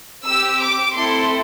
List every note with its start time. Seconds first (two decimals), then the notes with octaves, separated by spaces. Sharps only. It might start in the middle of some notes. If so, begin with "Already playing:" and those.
0.25 C4 G4 E6
0.59 D6
0.94 A3 C4 E4 A4 C6